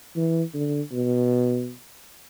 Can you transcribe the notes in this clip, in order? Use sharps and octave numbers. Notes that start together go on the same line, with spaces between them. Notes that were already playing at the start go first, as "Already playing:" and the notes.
E3
D3
B2